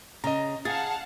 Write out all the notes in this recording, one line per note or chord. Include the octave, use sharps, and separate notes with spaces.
C#3 D#5 A#5
G#4 F5 F#5 A5 A6